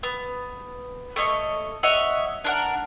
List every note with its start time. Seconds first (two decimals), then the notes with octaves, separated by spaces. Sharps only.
0.03 B3
1.16 A3 C#5 D#5 C#6
1.83 C#5 D#5 E5 F#5
2.44 D4 A#4 F#5